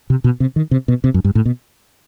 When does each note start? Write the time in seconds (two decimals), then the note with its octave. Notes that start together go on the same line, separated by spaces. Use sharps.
0.10 C3
0.24 B2
0.40 C3
0.56 D#3
0.71 C3
0.88 B2
1.04 C3
1.14 F#2
1.24 G2
1.35 A2
1.45 B2